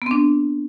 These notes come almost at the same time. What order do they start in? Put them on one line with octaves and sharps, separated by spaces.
B3 C4 D4